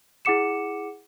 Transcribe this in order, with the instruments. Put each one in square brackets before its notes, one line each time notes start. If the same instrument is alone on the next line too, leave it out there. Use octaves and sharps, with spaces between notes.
[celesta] E4 G#4 F#5 D6 C#7 E7